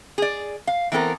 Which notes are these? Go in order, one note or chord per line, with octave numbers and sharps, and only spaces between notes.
G#4 D5
F5
E3 B3 C4 A4 A#4